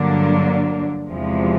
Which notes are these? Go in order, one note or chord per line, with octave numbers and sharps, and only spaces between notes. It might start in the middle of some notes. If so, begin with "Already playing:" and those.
Already playing: G2 D3 F#3 A#3 D4
E2 C3 F3 G#3